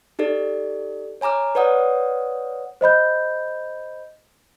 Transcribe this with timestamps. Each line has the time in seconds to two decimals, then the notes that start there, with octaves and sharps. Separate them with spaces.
0.19 D#4 G4 A4 D5
1.21 C#5 G#5 A#5 D6 F6
1.55 B4 C#5 D5 F#5 D#6
2.81 C5 D#5 B5 G6